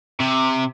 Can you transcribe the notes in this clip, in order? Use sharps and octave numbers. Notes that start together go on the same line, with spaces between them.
C3